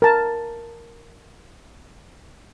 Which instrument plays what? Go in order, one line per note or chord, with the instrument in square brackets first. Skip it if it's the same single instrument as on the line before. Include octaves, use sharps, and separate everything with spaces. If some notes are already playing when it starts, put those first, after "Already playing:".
[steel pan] A#4 A5